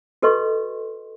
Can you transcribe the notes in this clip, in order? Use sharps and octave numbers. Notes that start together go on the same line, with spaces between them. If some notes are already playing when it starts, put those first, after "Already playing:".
F#4 A4 B4 D#5 C6 C#6